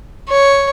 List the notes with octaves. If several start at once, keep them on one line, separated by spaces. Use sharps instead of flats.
C#5